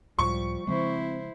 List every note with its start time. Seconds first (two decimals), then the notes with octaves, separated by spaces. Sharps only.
0.19 C#2 A2 F3 G3 C#6
0.67 C#3 F3 G#3 C4 E4 C5